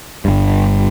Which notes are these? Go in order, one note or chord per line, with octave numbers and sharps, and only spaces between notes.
G1 G2